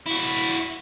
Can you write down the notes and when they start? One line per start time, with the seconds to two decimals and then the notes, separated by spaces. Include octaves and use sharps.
0.06 E4 F#4